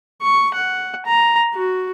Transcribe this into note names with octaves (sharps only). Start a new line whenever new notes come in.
C#6
F#5
A#5
F#4